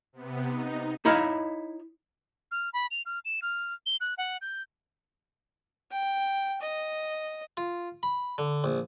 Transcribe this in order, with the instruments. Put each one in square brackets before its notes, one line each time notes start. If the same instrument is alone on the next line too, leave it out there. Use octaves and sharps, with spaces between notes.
[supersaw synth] C3 B3
D#4
[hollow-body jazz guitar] D#4 E4 C#5 D#5 F5
[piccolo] F6
B5
F7
F6
E7
F6
G7
F#6
F#5
G6
[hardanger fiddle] G5
D#5
[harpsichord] F4
B5
D3
A#1